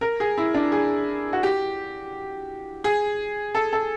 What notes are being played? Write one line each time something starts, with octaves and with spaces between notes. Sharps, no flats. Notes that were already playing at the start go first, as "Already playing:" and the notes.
A#4
G#4
E4
D4
G#4
F#4
G4
G#4
A4
A4